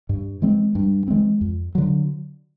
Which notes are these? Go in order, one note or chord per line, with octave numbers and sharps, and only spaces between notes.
G2
E3 G#3 C4
G2
E3 G#3 C4
F2
D3 F#3